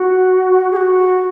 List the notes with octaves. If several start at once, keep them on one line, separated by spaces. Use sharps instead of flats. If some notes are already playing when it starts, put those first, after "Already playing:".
Already playing: F#4
G#4
F#4